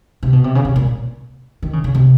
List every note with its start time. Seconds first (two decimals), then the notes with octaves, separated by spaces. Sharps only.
0.23 C3
0.33 B2
0.44 C3
0.55 C#3
0.65 C3
0.76 A#2
1.63 D#3
1.73 C#3
1.84 C#3
1.95 C3